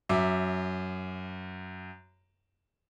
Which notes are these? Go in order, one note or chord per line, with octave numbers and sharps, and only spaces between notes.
F#2 E5 D6